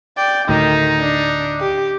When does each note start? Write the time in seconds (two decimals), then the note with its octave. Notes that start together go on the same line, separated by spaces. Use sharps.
0.17 D5 G5
0.49 D2 A2 D#3 D#4
0.99 D4
1.60 G4